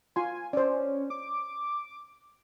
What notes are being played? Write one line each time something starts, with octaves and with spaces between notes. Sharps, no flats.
F4 G#5 C6
C#4 C5 D5
D6